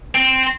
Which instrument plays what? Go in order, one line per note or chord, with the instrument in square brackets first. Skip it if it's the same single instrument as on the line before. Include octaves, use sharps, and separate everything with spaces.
[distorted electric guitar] C4